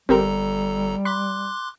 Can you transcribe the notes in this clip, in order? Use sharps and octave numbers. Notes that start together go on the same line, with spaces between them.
G1 G3 C4 G4 A4 A#4 A#5
B5 C6 D6 F#6